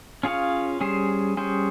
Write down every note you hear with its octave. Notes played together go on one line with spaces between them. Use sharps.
C#4 F4 G#4 C#5 F5
G3 C#4 G#4 C5
G3 C#4 G#4 C5